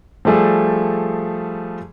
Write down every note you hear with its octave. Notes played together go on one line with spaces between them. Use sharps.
F3 G3 A3 G#4 A4